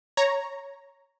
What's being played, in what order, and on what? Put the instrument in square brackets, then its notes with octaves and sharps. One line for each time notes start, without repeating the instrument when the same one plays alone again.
[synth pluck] C#5 A#5